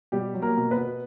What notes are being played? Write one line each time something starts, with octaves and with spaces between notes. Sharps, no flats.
B2 G3 G4
F#3
A#3 A#4
B2
B3 B4
B2